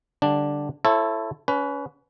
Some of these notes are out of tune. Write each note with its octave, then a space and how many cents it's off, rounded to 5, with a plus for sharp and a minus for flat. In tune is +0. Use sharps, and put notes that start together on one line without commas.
D3 +0 G3 +0 D4 +0
E4 +20 A4 +0 C#5 -35
C#4 +30 B4 +0